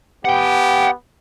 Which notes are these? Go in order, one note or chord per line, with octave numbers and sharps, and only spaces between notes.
B3 G4 F#5 G5